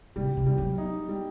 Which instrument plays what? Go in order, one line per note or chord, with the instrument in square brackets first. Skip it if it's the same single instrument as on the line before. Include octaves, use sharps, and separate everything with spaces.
[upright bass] C3 [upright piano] G3
[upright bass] C3
[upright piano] G3
[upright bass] F#3
[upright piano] D#4
G3